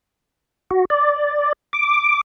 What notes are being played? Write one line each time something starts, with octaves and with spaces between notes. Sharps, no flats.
F#4
D5
D6